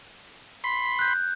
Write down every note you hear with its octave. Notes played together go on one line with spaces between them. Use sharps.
B5 C6
F#6 G6